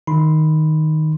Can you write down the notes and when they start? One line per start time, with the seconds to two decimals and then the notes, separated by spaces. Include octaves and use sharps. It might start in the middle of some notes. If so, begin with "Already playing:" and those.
0.07 D#3 D#4 B5 C6